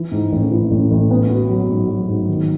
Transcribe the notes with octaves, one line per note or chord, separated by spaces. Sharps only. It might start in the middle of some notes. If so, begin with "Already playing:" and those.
Already playing: E3
G#2
A1
E3
A1
A1
B3
F#4
F#3
G#2
F#3
G#2
D#3